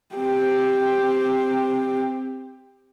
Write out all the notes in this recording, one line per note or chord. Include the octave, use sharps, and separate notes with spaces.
C4 G4